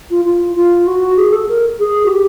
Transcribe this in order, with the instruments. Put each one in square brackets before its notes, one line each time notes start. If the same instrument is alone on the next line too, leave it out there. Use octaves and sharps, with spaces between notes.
[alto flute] F4
F4
F4
F#4
G#4
A4
A#4
G#4
F#4
G4